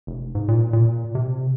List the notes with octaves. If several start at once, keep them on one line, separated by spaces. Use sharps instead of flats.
F1
G#2
A#2
A#2
C3